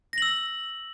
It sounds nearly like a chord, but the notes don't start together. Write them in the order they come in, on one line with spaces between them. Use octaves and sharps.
A#6 F#7 E6